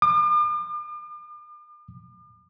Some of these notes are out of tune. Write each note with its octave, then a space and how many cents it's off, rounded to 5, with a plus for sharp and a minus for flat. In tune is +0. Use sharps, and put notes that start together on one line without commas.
D6 +45